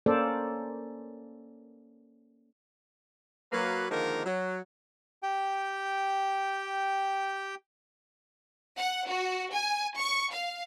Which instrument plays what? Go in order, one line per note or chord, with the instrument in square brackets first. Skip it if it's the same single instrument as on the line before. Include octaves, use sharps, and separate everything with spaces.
[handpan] A#3 C#4 A4 C5 D5
[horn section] F#3 A#3 B4
D3 D#3 F3 G#3 A#3 A#4
F#3
[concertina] G4 G5
[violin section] F#5
F#4
G#5
C#6
F5